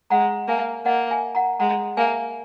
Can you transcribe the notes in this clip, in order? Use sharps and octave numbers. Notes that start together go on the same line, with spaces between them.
G#3 F#5 A#5
A#3 E5 G#5
A#3 D#5 F#5
E5 G#5
F#5 A#5
G#3 F#5 A#5
A#3 E5 G#5